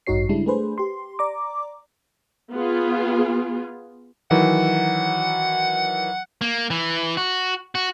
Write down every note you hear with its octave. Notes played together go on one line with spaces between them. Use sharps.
A1 G2 D#4 F#4 C#5 C7
C#3 G3 G#3 D4 E4
A3 D4 G#4 B4 C5
G4 C6
D5 A#5 D6
B3 F4 G#4
D#3 E3 F#3 F#5
A#3
E3
F#4
F#4